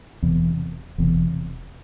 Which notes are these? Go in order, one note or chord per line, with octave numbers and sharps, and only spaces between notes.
E1 E2 C3
E1 E2 C3